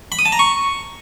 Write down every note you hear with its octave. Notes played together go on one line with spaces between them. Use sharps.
B5
D#6
A5
A#5
C#6